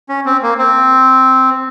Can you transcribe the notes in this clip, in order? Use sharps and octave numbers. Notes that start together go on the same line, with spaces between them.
C#4
C4
A#3
C4